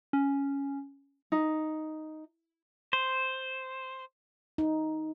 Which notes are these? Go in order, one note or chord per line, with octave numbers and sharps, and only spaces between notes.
C#4
D#4
C5
D#4